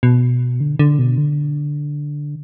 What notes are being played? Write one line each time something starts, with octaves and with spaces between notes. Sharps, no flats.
B2
D3
D3
B2
D3